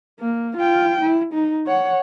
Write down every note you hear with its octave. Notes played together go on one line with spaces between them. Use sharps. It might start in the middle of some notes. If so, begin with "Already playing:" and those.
A#3
F4 G5
E4
D#4
C#5 F#5